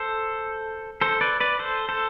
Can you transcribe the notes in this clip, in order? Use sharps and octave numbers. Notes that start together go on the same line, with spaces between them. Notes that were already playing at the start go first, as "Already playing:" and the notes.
Already playing: A4 C5
A4 C5
B4 D5
B4 D5
A4 C5
A4 C5